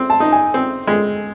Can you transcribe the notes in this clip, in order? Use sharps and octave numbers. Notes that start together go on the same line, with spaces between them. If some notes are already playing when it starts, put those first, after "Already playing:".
Already playing: C4
A5
D#4
G#5
C4
G#3